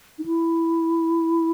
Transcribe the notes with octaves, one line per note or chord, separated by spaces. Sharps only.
D#4
E4